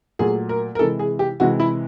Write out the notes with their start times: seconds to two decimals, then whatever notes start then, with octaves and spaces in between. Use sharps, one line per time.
0.19 A#2 F#3 A3 G#4
0.49 A#4
0.75 A#4
0.79 C3 E3 G#3 A4
0.99 G#4
1.19 G4
1.40 C3 E3 G#3 F#4
1.60 E4